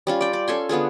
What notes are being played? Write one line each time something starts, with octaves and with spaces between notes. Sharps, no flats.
G3 C#4 F4
D5 G5
D5
C#4 A4 G#5 C6
D3 B3 F4 G#4